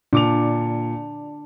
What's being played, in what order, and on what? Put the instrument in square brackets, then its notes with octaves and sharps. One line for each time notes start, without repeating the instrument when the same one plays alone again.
[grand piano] A#2 D6 F7 [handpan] D4